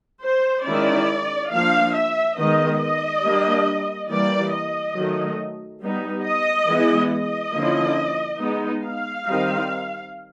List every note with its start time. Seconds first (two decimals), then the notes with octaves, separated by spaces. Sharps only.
0.23 C5
0.66 D#3 G#3 C#4 E4 D5
1.52 F3 A#3 D4 F5
1.95 E5
2.38 D#3 G#3 B3 D#4 D#5
2.81 D#5
3.24 G3 A#3 D4
4.10 E3 G3 A#3 D5
4.53 D#5
4.96 D#3 F#3 A3
5.82 G3 B3 D#4
6.25 D#5
6.68 E3 G#3 B3 E4
7.11 D#5
7.54 D3 F3 A#3 C#4 E4
8.40 G#3 B3 D#4
8.83 F5
9.25 D#3 G3 C4 D#4